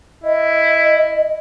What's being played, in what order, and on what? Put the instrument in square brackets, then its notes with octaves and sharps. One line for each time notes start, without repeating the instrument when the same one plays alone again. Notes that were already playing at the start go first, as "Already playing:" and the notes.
[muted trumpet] E4 [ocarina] D#5